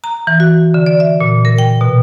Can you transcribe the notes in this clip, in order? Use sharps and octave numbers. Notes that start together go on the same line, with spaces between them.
A#5
E3
F#4
D3
D5
E5
A#2
A#4
G5
B2